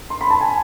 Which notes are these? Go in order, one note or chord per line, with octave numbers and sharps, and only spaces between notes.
C6
B5
A5
G#5